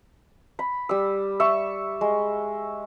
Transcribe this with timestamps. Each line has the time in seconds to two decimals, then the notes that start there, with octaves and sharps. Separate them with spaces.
0.59 B5
0.89 G3 E6
1.40 E5 C#6
2.01 G#3